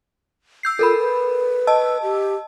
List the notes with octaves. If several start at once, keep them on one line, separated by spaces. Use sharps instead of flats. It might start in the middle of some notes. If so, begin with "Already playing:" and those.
E6 G6 C7
F4 A4 A#4 B5
B4
D#5 A5 E6
G4